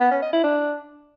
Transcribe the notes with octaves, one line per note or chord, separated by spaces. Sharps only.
B3
C#4
D#5
E4
D4